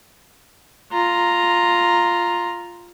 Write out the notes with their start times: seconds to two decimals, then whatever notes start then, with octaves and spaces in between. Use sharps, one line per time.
0.92 F4 A#5